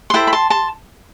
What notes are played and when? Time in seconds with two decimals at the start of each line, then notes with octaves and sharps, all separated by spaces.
0.10 C6
0.14 E4 A4 C5 G5 B5
0.27 B5
0.33 A5 C6
0.50 A5 C6